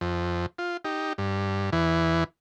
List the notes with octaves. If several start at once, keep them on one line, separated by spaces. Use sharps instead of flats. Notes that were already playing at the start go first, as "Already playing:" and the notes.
F2
F4
D#4 G4
G2
E2 E3